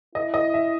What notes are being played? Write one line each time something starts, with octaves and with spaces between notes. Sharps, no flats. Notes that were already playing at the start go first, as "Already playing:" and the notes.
E4 D#5
D#5
E5